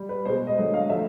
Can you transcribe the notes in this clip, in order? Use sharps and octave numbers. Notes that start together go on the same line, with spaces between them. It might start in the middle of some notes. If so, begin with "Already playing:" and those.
Already playing: G3
B4
B2 G#3 C5
D#5
D3 F#3 A3 D#5
F5
A2 F3 A3 E5